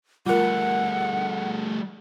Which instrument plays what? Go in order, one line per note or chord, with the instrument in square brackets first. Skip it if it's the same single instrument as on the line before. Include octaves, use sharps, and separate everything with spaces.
[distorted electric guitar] G3 A3 [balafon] F4 A#4 [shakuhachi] F#5